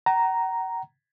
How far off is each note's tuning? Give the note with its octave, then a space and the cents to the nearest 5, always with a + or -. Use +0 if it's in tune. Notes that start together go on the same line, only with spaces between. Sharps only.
F#5 +40 A#5 +0